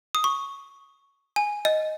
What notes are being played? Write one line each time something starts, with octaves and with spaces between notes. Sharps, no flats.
D#6
C#6
G#5
D#5